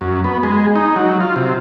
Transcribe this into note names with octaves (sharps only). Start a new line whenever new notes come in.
F#2
B3
G#3
D#4
F#3
F4
C3